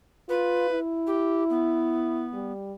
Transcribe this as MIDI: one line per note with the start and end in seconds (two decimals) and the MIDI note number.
0.29 0.65 65
0.29 0.79 71
0.71 2.27 64
1.07 1.44 67
1.50 2.52 59
2.34 2.73 55